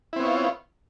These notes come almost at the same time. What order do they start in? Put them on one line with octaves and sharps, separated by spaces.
E4 C4 B3 C#5 F4